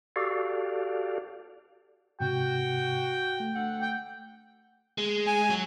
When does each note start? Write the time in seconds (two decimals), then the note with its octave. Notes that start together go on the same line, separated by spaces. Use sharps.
0.16 F#4 G4 A4 D5 F5
2.20 G#2 C3 F#4 G5
3.40 A3
3.55 D2 A4 F#5
3.82 G5
4.98 G#3
5.27 G#5
5.50 F#3